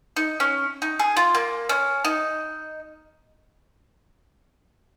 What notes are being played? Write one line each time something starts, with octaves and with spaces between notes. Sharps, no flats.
D#4
C#4
D#4
G#4
F4
A#3
C#4
D#4